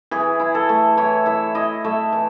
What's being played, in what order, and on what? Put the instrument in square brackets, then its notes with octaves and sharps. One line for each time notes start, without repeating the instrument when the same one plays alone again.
[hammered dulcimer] E3 G#4
E4
A4
A3
E3 C#5
E3 E5
E4 D#5
A3 E5
E3